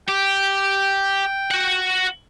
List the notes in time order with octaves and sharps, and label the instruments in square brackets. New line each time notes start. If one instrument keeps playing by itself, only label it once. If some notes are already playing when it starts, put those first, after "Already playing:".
[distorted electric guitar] G4 [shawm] G5
[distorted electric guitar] F#4 F#5